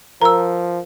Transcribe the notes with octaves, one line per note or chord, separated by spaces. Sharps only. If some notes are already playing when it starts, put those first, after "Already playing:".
F3 A#4 A#5 E6